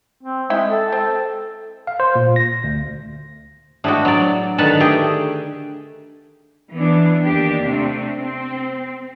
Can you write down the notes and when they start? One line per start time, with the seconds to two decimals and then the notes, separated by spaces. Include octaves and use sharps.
0.23 C4
0.50 G#3 E4 G5
0.68 A4
0.92 C4
1.87 F5
2.00 C5
2.15 A#2
2.36 A#6
2.64 D2
3.84 A2 G#3 D4 F#4 B4 G5
4.05 F#3 D5
4.58 D3 D#3 D#4 B4 F#5 A5
4.80 A3 G4 G#4
6.72 E3 B3 D4
7.25 D#2 A#3 D4 G4
7.66 C3 A3 C4 D4
8.17 C4